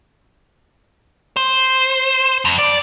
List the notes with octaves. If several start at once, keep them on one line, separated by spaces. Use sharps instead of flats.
C5
F2
D5